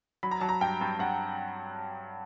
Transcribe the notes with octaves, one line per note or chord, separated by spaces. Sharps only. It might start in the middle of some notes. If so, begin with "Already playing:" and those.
F#3 B5
A#5
F#3 A5
A#5
G2 G5
G2
G2 F#5